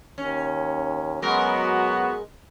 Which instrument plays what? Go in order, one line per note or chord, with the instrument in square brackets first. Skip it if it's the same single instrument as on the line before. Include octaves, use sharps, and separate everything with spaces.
[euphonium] D#2 [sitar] C#4
[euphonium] F#3 [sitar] G#3 A#4 [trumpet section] B3 F#4